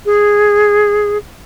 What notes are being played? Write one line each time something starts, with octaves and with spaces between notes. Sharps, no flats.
G#4